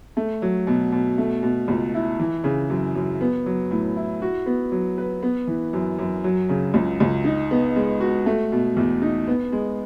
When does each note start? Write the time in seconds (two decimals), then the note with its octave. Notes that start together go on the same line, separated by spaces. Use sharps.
0.17 A3
0.42 F#3
0.67 B2
0.92 B2
1.18 A3
1.43 B2
1.68 C#2
1.94 E4
2.20 E3
2.44 C#3
2.70 F#2
2.95 F#2
3.21 B3
3.46 F#3
3.71 A2
3.96 E4
4.22 F#4
4.46 B3
4.72 F#3
4.98 B4
5.23 B3
5.47 E3
5.73 F#2
5.98 F#2
6.24 F#3
6.49 C#3
6.74 C#2
7.00 C#2
7.24 D#4
7.51 B3
7.76 G#3
8.00 F#4
8.26 A3
8.52 B2
8.77 E2
9.02 D#4
9.27 B3
9.52 G#3